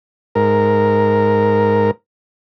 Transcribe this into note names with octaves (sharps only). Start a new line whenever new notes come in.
G#2 A#4